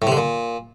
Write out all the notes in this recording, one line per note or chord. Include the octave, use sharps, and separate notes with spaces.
A2
C3
D3
A#2